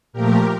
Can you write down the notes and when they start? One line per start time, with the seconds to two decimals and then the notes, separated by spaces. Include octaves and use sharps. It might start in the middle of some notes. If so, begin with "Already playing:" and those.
0.12 A#2 F3 A3 G4 A#4